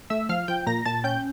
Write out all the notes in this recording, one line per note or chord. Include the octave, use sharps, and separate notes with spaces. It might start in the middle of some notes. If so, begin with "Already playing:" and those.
A3 E5 E6
F3 F5 F6
F3 G5 G6
A#2 A#5 A#6
A#2 A5 A6
C#4 G5 G6